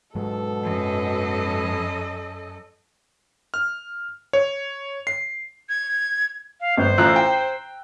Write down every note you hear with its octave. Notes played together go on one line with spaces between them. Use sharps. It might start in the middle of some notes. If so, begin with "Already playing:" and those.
G#2 B2 F#3 G#3 A4
F#2 D#5
F6
C#5
C7
G#6
F5
G1 C5
A1 A2 F4 A#5 E6 F#6
G5